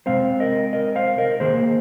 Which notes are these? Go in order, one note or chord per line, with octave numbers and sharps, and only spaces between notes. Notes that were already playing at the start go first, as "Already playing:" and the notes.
C3 G#3 C4 C5 F5
A#4 D#5
A#4 D#5
C5 F5
A#4 D#5
D#3 A#3 G#4 C5